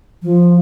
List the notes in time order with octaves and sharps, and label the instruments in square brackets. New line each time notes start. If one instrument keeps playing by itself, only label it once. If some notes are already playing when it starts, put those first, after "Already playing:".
[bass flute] F3